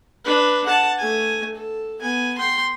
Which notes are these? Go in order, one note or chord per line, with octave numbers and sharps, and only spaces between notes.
D4 B4
F#5 A5
A3 G#5
A4
B3 G#5
G5 C6